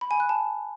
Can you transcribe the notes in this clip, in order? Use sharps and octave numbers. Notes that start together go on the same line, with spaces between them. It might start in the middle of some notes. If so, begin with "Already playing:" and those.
B5
G#5
F#6
A5